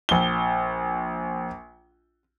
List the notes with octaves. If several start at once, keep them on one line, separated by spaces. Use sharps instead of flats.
A#1 G7